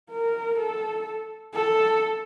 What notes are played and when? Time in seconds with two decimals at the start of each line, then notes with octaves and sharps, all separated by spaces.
0.11 A#4
0.58 A4
1.54 A4